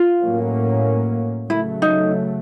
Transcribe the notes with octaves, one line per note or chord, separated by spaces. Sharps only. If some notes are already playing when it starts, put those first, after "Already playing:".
Already playing: F4
A2 F#3 A#3 C#4
C#3 F#3 A3 E4
D#4